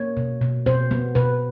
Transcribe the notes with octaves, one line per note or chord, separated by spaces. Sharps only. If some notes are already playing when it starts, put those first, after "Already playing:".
Already playing: A#3 C#5
B2
B2
B2 C5
B3
B2 B4